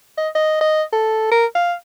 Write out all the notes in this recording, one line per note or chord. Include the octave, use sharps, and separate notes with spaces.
D#5
D#5
D#5
A4
A#4
F5